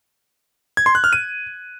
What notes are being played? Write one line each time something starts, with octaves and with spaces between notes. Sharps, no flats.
G#6
C6
F#6
F6
D#7